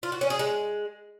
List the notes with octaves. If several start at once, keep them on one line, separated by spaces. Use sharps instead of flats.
F4
F#4
C#4
G#4
G#3